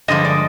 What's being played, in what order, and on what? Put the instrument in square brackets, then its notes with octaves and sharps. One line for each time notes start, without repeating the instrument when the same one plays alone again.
[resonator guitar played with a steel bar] G2 D3 F3 G#3 D#5
D5